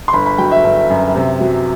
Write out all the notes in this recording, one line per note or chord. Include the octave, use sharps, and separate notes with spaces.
C6
G1 B5
B5
F#3 G5
E5
G1
F#2
C3
F#3